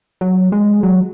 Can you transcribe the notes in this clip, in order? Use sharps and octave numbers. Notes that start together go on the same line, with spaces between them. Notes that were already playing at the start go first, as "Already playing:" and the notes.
F#3
G#3
F#3